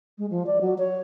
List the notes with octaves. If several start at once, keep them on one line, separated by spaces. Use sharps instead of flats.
G#3
F3
D5
F#3
C#5